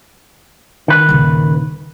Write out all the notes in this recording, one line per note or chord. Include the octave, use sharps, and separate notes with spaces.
D#3 B4
D#1 C#3